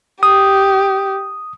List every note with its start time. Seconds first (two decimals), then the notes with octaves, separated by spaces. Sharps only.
0.23 G4 D#6